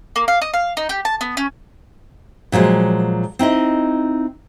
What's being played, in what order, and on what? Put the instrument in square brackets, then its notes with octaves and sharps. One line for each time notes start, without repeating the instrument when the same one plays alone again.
[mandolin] A#3
F5
D#5
F5
D#4
G4
A5
B3
C#4
[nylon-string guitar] A#2 F3 F#3 G#3
C4 D#4 E4 D#5